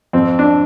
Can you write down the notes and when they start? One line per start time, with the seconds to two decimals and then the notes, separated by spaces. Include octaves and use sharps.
0.13 F2 C4
0.39 D4